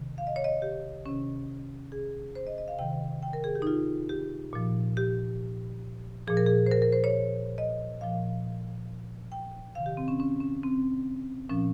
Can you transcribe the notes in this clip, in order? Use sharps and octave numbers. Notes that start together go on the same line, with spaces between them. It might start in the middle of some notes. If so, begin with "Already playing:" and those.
Already playing: C3 D#3
F5
D#5
C#5
D#5
G4
C3 D#3 C#4
G#4
C5
D#5
D#5
F5
C3 D#3 G5
G5
A#4
G#4
G4
D#4
F4
G4
A#2 F3
G4
A#2 F3 G#4
A#4
G#4
C5
A#4
A#4
C5
C#5
D#5
A#2 F3 F5
G5
C3 D#3 F5
G4
C4
C#4
C#4
C#4
C4
A#2 F3 C#4